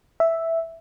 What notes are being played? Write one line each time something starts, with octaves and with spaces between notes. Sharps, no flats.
E5